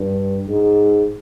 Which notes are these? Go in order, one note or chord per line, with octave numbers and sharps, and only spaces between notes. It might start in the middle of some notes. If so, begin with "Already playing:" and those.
Already playing: G2
G#2